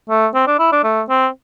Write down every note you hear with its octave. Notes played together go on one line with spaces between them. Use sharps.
A3
C4
D4
E4
D4
A3
C4